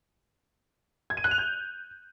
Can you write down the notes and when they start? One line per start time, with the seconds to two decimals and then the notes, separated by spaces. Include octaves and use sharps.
1.10 G#6
1.17 D#7
1.24 F#6
1.31 F7
1.38 G6